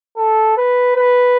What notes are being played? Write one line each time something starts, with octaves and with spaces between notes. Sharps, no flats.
A4
B4
B4